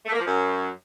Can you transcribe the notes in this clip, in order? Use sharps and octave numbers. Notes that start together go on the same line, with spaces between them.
A3
A#3
F3
F#2